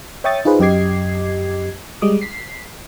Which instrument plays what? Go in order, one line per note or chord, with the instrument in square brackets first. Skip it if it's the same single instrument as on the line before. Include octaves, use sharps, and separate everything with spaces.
[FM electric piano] C#5 E5 G5 C#6 D#6 A6
D#4 F4 G#4 B4 C5
F#2 G4 D#5 D6 G#6 C7
G3 G#3 D6 D#6
B6 C7